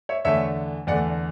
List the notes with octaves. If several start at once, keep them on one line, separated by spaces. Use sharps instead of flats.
C#5 E5
E2 D3 A3 C#5 E5
E2 D3 A3 D5 F#5